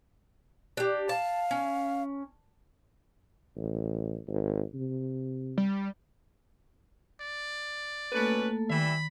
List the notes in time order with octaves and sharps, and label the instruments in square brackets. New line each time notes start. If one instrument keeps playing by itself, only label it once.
[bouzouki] D4 G4
[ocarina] F5 [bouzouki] A5
[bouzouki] C#4
[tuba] A1
G#1
C3
[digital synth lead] G3
[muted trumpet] D5
[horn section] B2 C#4 B4 [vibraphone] A3 A#3 A4
[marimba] D#3 [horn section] E3 G3 E5 [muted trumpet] B5